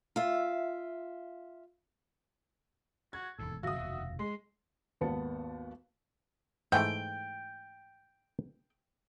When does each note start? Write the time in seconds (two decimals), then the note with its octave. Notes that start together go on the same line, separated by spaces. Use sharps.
0.16 F4 E5
3.13 F#4 G#6
3.39 E1 D#2 G#2 A4
3.63 G#1 C#3 F#3 F#4 E5 F5 D#6 A#6
3.76 F1 D#2 B2
4.19 G#3 C6
5.01 G#1 D#2 B3 A5 C#7
6.72 G#2 E3 A3 G5